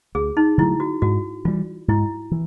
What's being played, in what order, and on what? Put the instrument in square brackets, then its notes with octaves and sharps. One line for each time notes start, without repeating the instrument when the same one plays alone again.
[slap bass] D2 [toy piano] G#4
[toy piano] D#4
[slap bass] D3 F#3 A3 [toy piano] E4
[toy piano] F#4
[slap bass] G#2 [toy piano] F#4
[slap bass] E3 G3 [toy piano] F4
[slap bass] G#2 [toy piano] E4
[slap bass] E3